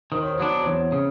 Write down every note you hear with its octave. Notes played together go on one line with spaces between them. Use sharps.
D#3 C5
C#5
C5
F#3 B3 D4
C5
E2 C#5
C#3